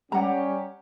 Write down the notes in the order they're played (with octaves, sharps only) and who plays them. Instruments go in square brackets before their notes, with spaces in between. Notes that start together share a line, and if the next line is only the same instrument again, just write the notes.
[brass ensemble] G3 C#4 G4 [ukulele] F#5 A#5